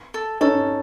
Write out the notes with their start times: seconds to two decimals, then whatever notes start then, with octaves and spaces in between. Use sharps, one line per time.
0.14 A4
0.41 C#4 D#4 A4